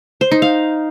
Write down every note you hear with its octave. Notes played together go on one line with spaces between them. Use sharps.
C5
D#4
F5